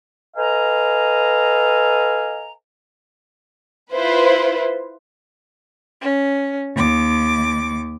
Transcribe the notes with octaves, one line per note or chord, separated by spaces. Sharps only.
A4 B4 D#5 F5 G#5 A#5
E4 F4 B4 C5
C#4
D#2 D6